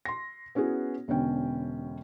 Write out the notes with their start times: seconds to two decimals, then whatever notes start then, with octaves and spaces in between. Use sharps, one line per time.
0.05 C6 A#6
0.55 B3 C#4 E4 F#4 G#4
1.08 E1 B2 D3 C#4 G5